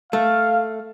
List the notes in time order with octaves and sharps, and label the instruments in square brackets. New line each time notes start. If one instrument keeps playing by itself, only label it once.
[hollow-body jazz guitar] A3 [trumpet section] F5